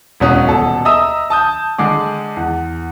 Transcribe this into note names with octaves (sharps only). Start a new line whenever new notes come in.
E1 B2 C#4 D#6
D#1 B2 A4
D#5 E5 A#5 D#6 E6
A5 D#6 G6
D3 G#3 G#4 D6
E2